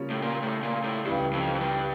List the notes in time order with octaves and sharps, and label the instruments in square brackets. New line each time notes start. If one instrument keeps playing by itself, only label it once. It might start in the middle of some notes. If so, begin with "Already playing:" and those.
Already playing: [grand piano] C#3 G3 A#3 C#4 F4
[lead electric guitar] A2
A#2
A2
A#2
A2
[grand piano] C#2 C#3 E3 G3 [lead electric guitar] G2
[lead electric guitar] F2
F2
G2